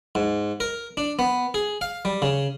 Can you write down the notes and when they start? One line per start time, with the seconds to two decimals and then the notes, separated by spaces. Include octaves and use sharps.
0.15 G#2
0.60 A#4
0.97 D4
1.19 B3
1.54 G#4
1.81 F5
2.05 G3
2.22 C#3